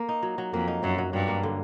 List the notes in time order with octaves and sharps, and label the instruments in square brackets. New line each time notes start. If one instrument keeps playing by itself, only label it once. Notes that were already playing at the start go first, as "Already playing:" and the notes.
Already playing: [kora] A#3
D#4
F#3
F#3
[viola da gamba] F2 [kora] A#3
[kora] D#4
[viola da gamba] F#2 [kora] F#3
[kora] F#3
[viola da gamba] G2 [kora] F#3
[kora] A#3
D3